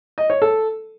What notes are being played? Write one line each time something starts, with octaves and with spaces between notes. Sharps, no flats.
D#5
C#5
A4